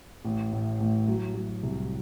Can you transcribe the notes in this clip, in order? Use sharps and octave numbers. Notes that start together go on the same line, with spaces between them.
A1
A2
A1
F#3
F#3
C2